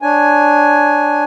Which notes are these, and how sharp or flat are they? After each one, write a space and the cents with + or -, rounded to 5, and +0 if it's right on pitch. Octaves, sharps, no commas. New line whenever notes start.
D4 +0 C#5 +0 G#5 +5